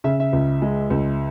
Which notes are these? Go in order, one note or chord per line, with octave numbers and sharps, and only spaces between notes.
C#3 E5
E5
C#2
G#3
C#2